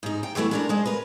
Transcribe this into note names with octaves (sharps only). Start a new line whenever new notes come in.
G#2 D#4
G5
E3 F#3 A3 B3 E4
G#3 D4 A#4
G#3 C5
A#4 B4